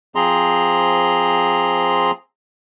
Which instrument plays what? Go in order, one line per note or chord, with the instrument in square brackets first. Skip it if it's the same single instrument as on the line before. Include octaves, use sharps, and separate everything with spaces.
[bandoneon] F3 C4 G#4 A#5 C6